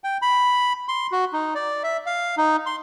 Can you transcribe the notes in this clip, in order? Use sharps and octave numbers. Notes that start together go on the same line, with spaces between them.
G5
B5
C6
F#4
D#4
D5
E5
F5
D#4
C6